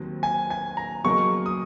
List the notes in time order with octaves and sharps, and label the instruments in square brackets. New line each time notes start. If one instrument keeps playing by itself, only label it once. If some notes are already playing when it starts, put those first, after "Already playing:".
Already playing: [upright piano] D#2 D#3 F#3 C4
[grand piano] G#5
G#5
A#5
[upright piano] C#3 F#3 A#3 D#4 A#4 [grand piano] C#6
[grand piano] D#6